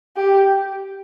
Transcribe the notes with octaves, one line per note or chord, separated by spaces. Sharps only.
G4